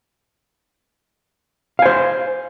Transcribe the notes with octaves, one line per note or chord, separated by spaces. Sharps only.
C5 F5 G#5